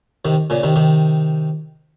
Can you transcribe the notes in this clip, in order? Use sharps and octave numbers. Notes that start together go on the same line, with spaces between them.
C3 D#3
A#2 C#3
C3 D#3
C3 D#3